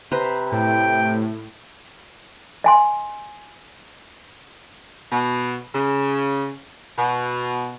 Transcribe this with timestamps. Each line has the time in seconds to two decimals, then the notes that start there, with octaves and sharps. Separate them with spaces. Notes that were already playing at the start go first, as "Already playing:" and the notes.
0.12 C3 B4 C5 A#5
0.52 A2 G5
2.64 D#5 G#5 C6
5.12 B2
5.73 C#3
6.97 B2